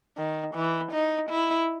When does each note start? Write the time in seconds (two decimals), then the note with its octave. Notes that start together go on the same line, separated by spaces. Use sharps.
0.17 D#3
0.55 E3
0.92 D#4
1.29 E4